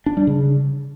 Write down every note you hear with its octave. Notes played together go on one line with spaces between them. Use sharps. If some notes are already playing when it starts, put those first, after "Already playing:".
D4
G3
C#3